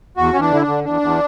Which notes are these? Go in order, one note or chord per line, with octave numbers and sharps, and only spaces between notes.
E2 F#4
E2 C#4
D4
D3 E4
D4
D3
E2 D4
E2